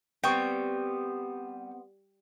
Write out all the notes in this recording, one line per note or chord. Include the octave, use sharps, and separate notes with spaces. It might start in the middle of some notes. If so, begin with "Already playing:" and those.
G3 B3 C4 G5 C#6